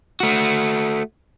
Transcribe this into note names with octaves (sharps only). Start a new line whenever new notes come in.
A3 F#4